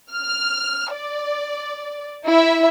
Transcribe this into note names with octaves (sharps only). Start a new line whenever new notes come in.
F6
D5
E4 E5